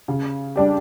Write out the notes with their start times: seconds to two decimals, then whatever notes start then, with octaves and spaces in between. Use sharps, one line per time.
0.08 C#3
0.56 G3 D4 G4